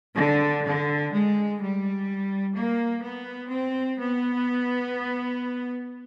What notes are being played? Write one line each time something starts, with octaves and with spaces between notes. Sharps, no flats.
D3
D3
G#3
G3
A#3
B3
C4
B3